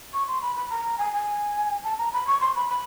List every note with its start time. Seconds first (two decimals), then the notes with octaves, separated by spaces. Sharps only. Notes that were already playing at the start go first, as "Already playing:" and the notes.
0.13 C#6
0.28 C6
0.42 B5
0.56 B5
0.70 A#5
0.98 G#5
1.13 G#5
1.84 A5
1.98 A#5
2.13 B5
2.27 C#6
2.41 C6
2.55 B5
2.69 B5